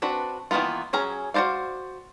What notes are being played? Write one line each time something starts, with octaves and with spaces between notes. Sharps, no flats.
C4 D4 F#4 B4
D#3 E3 A#3 B3 F4
F#3 C#4 G#4 A#5
F#4 B4 C5 D5 F5